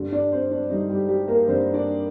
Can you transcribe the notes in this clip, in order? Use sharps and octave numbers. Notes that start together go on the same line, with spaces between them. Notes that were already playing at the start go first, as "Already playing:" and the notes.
Already playing: G2 D3 G3
D4 D5
C4 C5
D4
G2 D3 G3 D#4
G3 G4
G3 G4
A#3 A#4
G2 D3 G3 C4 C5
D4 D5